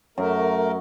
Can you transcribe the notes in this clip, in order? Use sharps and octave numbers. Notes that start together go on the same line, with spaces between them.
F#2 A3 A#4